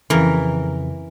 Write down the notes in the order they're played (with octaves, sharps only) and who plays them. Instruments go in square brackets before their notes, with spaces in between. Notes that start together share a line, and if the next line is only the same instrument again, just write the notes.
[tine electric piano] F2 C#3 [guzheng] E3 A#4